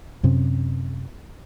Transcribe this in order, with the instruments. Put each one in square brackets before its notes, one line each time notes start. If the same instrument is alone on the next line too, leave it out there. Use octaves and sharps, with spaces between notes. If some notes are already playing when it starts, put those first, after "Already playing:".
[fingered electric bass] F#2 C3 C4 C#4